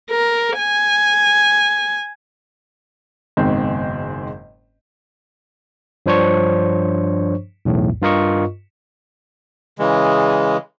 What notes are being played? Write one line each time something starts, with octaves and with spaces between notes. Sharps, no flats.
A#4
G#5
F#1 G#2 B2 D#3 C4
G2 F3 D4 C5 C#5 C#6
B1 E2 A2
G2 F4 A#4 D#5 C#6
C#3 E3 G#3